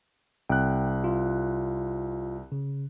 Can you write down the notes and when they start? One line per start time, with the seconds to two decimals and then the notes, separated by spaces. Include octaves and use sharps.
0.49 C2 G5 F#6
1.04 F4
2.52 C#3